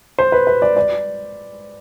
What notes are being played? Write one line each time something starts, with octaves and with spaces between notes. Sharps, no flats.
C5
B4
B4
D5
D5